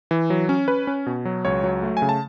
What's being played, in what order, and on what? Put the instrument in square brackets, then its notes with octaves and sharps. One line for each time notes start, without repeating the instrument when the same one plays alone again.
[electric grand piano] E3
F#3
C#4
C#4 B4
C#4
B2
F#3
C#2 C#5
F#3
A3
G#5
C#3
A5